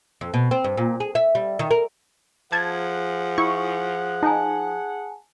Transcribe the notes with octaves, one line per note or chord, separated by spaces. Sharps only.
F2
B2
C4
G2
A#2
G#4
E5
G3
D#3
A#4
F3 G#4 F#5 A5 G#6
E4 C#6
D#4 G#5 A5